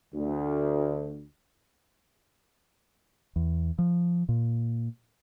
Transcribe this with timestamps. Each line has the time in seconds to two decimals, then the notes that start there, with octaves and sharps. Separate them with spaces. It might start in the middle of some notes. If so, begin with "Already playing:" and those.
0.15 D2
3.36 E2
3.79 F3
4.29 A#2